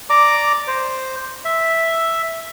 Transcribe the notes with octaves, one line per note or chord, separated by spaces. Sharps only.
D5 A#5 D6
C5
E5